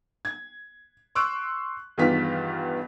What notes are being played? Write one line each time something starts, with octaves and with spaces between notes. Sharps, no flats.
G#6
C6 C#6 E6 F#6 D7
E2 G2 D#3 B3 F4 B6